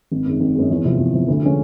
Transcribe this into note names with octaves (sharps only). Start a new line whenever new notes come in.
G#1
F#2 D#3 G#3
G#1
F#2 D#3 G#3
E2
C3 F3
E2
C3 F3
D2
D3 F3 G#3 C#4